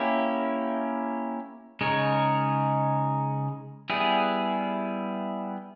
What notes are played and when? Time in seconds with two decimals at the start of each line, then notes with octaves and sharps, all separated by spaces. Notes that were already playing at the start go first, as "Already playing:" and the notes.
Already playing: A#3 C#4 E4 G4
1.81 C#3 G#3 D#4 A#4 C#5
3.90 G3 B3 E4 G#4